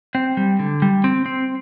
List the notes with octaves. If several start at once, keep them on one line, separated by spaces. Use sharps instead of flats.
C4
G3
D3
G3
C4
C4